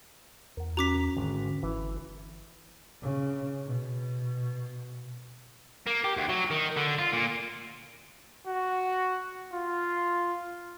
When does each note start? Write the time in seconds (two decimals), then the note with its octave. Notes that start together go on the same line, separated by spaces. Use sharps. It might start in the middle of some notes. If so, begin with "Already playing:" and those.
0.57 E2 A#4 F#5
0.77 C#4 F#4 A#5 D6 B6
1.17 G#1 D3
1.63 G1 E3
3.02 C#3
3.66 B2
5.87 A#3
6.04 G4
6.17 D2
6.29 F#3
6.51 D#3
6.77 D3
6.99 F4
7.13 A#2
8.47 F#4
9.53 F4